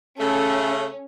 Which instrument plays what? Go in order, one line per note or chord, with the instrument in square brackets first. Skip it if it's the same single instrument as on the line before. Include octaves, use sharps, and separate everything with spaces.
[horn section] C#3 A3 [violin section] C#4 [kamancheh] A4